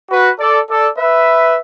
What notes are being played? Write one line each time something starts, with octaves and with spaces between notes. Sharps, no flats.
F#4 B4
A4 D5
A4 D5
B4 E5